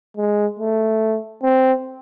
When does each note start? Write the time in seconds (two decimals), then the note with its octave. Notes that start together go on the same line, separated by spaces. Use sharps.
0.17 G#3
0.59 A3
1.43 C4